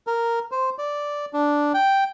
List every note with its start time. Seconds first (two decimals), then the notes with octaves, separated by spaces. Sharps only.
0.07 A#4
0.52 C5
0.78 D5
1.33 D4
1.74 G5